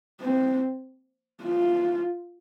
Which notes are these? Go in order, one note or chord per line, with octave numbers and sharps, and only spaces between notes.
C4
F4